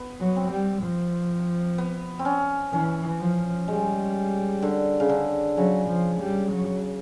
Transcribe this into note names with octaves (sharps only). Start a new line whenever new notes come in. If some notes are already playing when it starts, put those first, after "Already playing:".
Already playing: B3
F#3
C4
G3
F3
B3
C4
C#4
E3 C#4
F3
G3 G#3
D3
C#3
D3
C#3 F#3
F3
G3
F#3